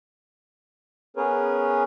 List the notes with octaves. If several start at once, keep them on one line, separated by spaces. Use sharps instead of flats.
B3 C#4 G#4 A#4 B4 C#5